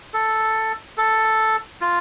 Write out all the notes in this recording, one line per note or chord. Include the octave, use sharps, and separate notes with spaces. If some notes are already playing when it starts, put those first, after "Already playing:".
A4
A4
F4